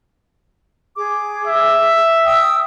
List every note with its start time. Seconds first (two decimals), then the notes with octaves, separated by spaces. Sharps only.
0.96 G#4 D6
1.48 E5
2.25 G5 D#6 E6